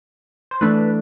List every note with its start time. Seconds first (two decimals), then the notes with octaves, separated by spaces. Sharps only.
0.51 C5
0.61 E3 A3 D4 B4